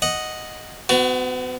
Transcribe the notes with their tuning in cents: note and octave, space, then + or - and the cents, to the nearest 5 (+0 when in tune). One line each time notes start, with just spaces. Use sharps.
D#5 +0 F#5 +0
B3 +40 F#4 +0